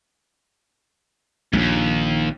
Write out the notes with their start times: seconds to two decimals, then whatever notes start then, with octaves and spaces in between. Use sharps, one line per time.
1.53 A#1 D#2 G#2